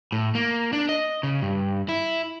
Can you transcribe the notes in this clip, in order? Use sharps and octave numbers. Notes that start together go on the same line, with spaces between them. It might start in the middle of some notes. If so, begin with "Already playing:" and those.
A2
A#3
D4
D#5
C#3
G2
E4